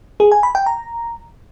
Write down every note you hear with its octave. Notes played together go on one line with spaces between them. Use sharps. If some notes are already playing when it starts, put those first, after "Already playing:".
G#4
G#5
B5
G5
A#5